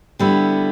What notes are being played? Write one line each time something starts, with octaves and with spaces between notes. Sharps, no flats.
D3 G3 B3 E4